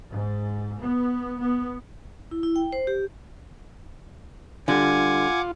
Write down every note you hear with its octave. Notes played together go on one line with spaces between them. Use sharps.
G#2
B3
B3
E4
E4
G5
C5
G4
D3 G3 F4 F#5 G#5 D6